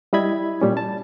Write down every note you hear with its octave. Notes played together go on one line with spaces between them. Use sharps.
G3 E4 D#5 B5 G#6
A#2 G3 C#4
A5